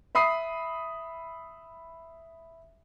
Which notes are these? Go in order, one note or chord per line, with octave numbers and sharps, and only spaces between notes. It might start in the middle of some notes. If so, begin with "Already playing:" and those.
E5 B5 D#6 C7